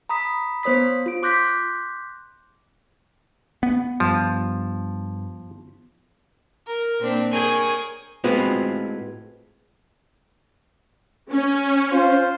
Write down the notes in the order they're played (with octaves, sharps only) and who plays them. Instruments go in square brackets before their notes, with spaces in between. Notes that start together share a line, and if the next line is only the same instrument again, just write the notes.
[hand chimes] A#5 B5 D#6 B6
B3 C5 C#5 D#6 B6
F4 D7
C6 D6 F#6 G6 A#6 B6
[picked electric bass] B3
[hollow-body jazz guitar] G2 [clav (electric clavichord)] F3
[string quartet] A#4
A#2 C4 D4
G#4 A#4 C#5 G5 G#5
[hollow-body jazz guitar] A2 G#3 B3 C4 F4 F#4
[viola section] C#4
[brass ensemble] F4 C5